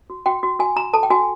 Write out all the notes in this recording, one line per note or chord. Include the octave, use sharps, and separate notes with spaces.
F#4
F#4 G5
F#4
F#4 G#5
F#4 A#5
A4 A5
G5
F#4 G#5